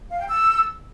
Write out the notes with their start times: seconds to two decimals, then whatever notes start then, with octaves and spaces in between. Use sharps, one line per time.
0.10 F5
0.19 G5
0.28 E6